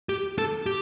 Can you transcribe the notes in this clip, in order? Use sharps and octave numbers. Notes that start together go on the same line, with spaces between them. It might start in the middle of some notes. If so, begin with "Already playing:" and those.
G4
A4
G4